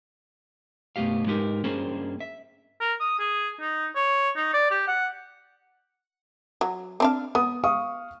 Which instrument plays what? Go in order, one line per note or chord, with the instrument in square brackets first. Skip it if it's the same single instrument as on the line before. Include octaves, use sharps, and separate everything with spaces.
[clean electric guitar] B1 F#2 A3 B3 G4 F5
G#2 G#3 D#4 G4 A#4
G2 A#3 C#4 D4 G#4 C5
E5
[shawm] A#4
D#6
G#4
D#4
C#5
D#4
D5
G4
F#5
[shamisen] F#3
C4 D4 F5
[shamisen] B3 [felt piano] D#6
[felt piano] F5 C#6 D#6